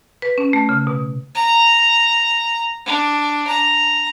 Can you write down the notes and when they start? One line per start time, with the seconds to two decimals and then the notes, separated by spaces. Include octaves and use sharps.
0.22 B4
0.38 C#4
0.53 A3
0.69 C#3
0.87 B2
1.35 A#5
2.85 D4
3.47 A#5